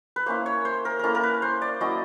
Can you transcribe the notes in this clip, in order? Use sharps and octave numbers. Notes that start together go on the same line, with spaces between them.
B4
A#3 C#4 E4 C5
C#5
C5
A#4
A#3 C#4 E4 A4 A#4
A#4
B4
C5
D5
F#3 A#3 C#4 E4 D#5